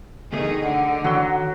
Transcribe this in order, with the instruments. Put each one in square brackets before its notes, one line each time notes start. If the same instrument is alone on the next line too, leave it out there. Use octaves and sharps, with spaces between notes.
[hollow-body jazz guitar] D2 B2 A3 [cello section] D#3 D#4 G#4
[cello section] D3 D#4 [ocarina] F#5
[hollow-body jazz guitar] D#3 C6 [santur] F#3 F#4 E6